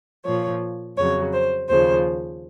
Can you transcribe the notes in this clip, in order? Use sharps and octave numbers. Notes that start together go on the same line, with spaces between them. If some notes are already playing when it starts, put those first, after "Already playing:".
A#2 F3 C#5
F2 C#3 F#3 C#5
C5
D#2 C#3 F3 C5